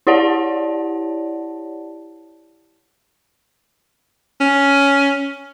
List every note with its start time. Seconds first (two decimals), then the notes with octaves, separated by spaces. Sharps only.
0.07 E4 G4 C#5 D5 F#5 A5
4.40 C#4